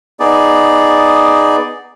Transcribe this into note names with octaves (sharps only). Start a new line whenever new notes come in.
B3 D#4 G#4 D5